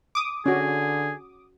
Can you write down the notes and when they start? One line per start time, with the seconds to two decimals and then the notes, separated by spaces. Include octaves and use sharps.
0.15 D6 D#6
0.46 D3 C#4 F#4 G#4